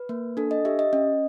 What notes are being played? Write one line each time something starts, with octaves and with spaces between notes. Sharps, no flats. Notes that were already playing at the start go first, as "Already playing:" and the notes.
Already playing: B4
A#3
D4 A4
D#5
G4 E5
D#5
C#4 D#5